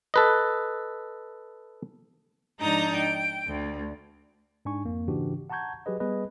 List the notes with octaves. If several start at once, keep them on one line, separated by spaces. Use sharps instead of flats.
A4 B4 D#5
G#2 F3 D4 D#4 A#5 G6
G5
D2
G#2 D4 G#5 C#6
F2 A#3
G#2 C#3 E3 D4 F#4 G4
F#5 A5 A#5 C#6 G6 G#6
F#3 G4 G#4 B4 D#5
G3 B3 G#4 B4 D#5